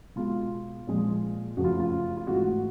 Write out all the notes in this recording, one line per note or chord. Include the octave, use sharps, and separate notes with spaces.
B2 G#3 F4
A#2 F3 G#3
F#2 C#3 F3 A3 F#4
F4
F4
F4
G#2 E3 A3 F#4